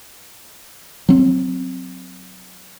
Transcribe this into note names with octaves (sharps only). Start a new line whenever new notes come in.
F#3 C4